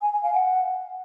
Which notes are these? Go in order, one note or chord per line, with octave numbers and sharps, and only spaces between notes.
G#5
G#5
F5
F#5